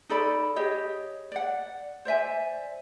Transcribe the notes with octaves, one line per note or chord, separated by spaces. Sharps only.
D#4 A4 D5 B5
G4 G#4 C#5 D#5
D5 F#5
C5 D5 E5 G#5